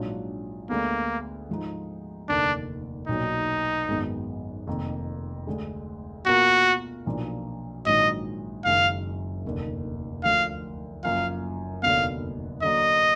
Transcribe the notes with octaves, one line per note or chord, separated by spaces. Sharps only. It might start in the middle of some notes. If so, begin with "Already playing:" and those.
Already playing: A#1 G#2 F#3 D4 F4
D2 D3 G#3 A#3 B3
G#2 F3 G#3 D#4
F1 D#2 D3 D4
B1 A#2 F#3 D#4
G#1 F#2 D#3 G#3 B3
F1 F2 D#3 A#3
D2 D3 G#3
B2 A#3 F4 F#4 A#4
B1 A#2 F3 A#3 D4
A#1 G#2 D#3 F#3 D#5
F#1 F#2 D#3 G#3 F5
F1 D#2 D3
D2 D3 F3 F5
F#1 F#2 F3 A#3 F4 F5
F1 D#2 D3 F#3 B3 F5
D3 F#3 A#3 D#5